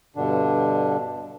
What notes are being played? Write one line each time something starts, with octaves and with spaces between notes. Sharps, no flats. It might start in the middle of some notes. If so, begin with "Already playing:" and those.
G2 B2 D3 D4